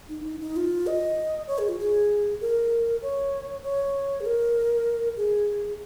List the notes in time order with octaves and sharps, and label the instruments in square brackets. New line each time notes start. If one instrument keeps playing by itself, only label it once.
[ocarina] D#4
D#4
D#4
F4
D#5
C#5
G#4
F4
G#4
A#4
C#5
C#5
G#4
A#4
G#4